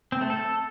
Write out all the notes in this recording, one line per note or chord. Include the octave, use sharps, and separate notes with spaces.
C4
A3
A4